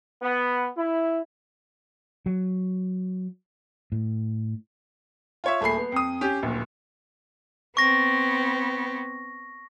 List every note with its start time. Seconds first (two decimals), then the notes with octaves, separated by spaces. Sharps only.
0.22 B3
0.77 E4
2.26 F#3
3.92 A2
5.44 F4 C#5 E5
5.61 D#1 A3 G#4 B5 C7
5.78 B3
5.92 F2 D#6
6.21 C#4 G4
6.42 D1 A#1
7.77 B3 C4 C#6 A#6